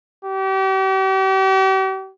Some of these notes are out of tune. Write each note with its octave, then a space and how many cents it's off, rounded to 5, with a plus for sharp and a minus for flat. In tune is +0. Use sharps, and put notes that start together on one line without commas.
G4 -40